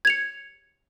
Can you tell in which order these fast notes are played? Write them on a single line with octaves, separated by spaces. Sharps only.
G#6 F7 C#7